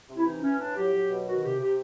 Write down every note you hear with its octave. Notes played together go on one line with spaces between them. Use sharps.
C3
E4
E3 D#4
E3 C#4
A2 D4
F#3 G4
F#3
B2
D#3 F#4
C3 G4
C3 G4